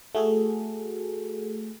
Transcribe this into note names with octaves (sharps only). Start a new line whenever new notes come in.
A3 F#4 G#4 A4